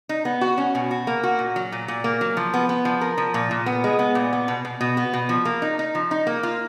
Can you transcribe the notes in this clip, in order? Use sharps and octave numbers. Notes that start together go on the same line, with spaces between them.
D#4
B3
F#4
C#4
B2
F#4
A#3
F#4
A#2
F#3
A#2
A#2
A#3
F#3
F3
B3
B3
F3
A#4
F3
A#2
A#2
B3
G#3
B3
A#2
B3
B2
B2
B2
B3
B2
F3
A#3
D#4
D#4
F3
D#4
A#3
F4